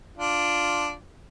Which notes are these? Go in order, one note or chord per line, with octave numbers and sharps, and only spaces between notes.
D4 F4